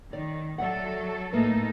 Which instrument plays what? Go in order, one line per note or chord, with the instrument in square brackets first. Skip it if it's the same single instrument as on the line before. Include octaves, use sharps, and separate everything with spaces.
[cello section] D#3 [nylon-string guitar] D5
[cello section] F#3 A4 [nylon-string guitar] D5 E5 F#5
[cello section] A2 D#4 A4 [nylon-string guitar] A3 A#3 B4